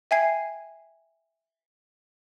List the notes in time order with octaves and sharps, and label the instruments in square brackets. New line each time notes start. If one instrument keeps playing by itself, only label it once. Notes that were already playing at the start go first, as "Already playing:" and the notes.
[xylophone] E5 G5 G#5 G#6 C7